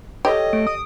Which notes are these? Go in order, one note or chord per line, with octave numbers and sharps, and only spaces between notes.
G4 A4 C#5 D#5
A3 D7
D#6